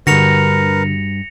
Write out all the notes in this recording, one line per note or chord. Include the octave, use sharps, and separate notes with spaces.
G2 D3 F#4 A#4 B4 A#6 C#7 F7